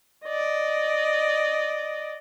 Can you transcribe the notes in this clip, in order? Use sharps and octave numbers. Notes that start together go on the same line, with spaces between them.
D5 D#5